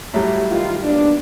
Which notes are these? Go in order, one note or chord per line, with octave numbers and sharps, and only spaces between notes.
A2 F#3 G3
D#3 F4
D#2 B3 D4